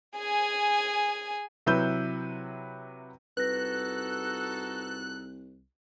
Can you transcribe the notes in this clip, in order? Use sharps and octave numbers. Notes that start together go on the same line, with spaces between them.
G#4 G#5
C3 F#3 E4 B4 E6 G6
C2 D#4 F#4 A4 B4 F#6 A#6